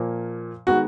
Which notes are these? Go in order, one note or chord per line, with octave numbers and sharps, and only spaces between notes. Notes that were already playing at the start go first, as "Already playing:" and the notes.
Already playing: A#2 F3 A#3
D#3 G#3 B3 F#4